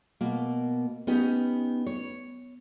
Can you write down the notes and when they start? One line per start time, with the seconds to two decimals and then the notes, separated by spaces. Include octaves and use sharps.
0.21 B2 A#3
1.07 B3 C#4 D#4 G4 B4
1.86 C#5